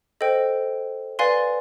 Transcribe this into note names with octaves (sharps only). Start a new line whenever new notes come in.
A4 C5 D#5 G5
B4 D5 F5 G#5 C6